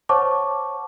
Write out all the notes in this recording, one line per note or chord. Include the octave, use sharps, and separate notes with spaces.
C5 C#5 F#5 A5 C#6 D6